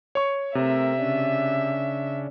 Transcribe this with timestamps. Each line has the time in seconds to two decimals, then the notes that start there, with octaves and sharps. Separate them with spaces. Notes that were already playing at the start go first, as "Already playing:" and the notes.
0.15 C#5 C#6
0.55 C3 A3 C4 A#4 E5
0.98 C#3 C#4 D4